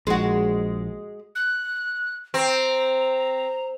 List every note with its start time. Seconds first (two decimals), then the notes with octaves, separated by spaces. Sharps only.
0.07 A#1 G#3 F#4
1.35 F#6
2.34 C4 A#5